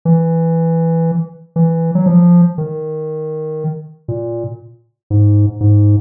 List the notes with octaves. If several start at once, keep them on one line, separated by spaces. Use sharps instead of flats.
E3
E3
F#3
F3
D#3
A#2
G#2
G#2